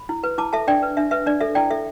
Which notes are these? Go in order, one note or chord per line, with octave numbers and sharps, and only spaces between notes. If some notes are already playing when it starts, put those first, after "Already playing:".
Already playing: B5
E4
B4
E4 A5 D6
A4 E5 A5
D4 D5 G5
B4
D4 E5
B4 E5
D4 D5
A4 E5
E4 D5 G5
A4 E5